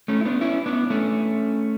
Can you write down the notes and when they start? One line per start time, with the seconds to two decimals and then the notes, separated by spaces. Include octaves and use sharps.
0.08 A3 C#4
0.21 E4
0.25 B3 D4
0.41 C#4 E4
0.66 B3 D4
0.90 A3 C#4